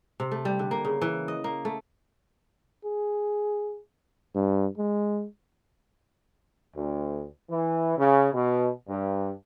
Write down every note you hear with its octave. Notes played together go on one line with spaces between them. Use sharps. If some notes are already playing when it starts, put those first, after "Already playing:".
C3
A3
G3
D3
A#3
C#3
E3
D#5
A#3
A3
G#4
G2
G#3
D2
E3
C#3
B2
G2